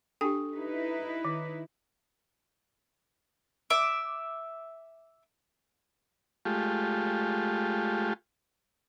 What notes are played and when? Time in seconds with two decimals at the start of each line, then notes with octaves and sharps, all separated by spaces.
0.21 D4 G4 A4 G5 G#5
0.55 D#4 E4 B4
1.25 D#3
3.70 E5 D6
6.45 G#3 A3 F4 G4